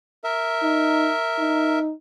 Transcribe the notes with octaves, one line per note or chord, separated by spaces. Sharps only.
A#4 E5
D#4
D#4